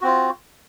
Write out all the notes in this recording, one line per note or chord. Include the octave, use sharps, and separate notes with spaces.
C4 F4 F#4